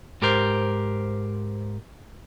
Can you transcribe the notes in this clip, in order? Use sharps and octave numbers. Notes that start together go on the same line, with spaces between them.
G#2 G4 A#4 C5